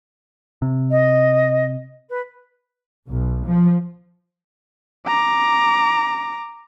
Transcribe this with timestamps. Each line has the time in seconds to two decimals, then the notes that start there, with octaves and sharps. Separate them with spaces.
0.62 C3
0.90 D#5
2.09 B4
3.09 B1
3.46 F3
5.07 A#5 D6